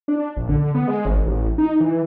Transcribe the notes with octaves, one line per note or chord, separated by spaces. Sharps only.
D4
A#1
D3
B3
G#3
G#1
A1
D#4
E3